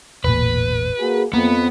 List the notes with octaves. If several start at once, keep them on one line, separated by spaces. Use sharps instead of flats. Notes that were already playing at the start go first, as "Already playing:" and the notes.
E1 A1 A#2 B4
A#3 F#4 G#4
F2 A#3 B3